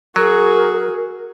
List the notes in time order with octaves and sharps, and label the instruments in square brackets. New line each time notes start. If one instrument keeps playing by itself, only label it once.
[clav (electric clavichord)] F#3 [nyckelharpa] F#4 G#4 [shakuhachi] A#4